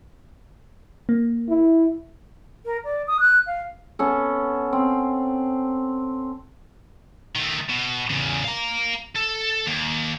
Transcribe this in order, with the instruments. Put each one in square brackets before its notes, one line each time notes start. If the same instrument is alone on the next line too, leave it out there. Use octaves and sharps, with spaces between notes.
[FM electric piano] A#3
[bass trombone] E4
[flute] A#4
D5
D#6
F#6
F5
[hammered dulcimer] B3 C#4 A4
C4
[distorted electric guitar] D#3 A3
B2
E2 C#3
F5 A#5
A4
D#2